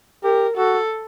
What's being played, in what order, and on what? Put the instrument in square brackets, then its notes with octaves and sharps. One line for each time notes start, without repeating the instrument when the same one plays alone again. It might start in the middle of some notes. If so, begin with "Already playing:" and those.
[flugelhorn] G4 [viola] A#4
[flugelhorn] F#4 [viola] A4